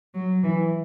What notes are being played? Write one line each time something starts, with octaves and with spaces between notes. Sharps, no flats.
F#3
E3